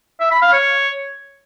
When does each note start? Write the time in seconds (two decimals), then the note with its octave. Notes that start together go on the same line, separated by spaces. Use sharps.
0.20 E5
0.31 B5
0.42 F5
0.52 C#5